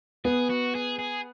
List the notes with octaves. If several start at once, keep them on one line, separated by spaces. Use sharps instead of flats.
B3 G#4
F#4
G#4
G#4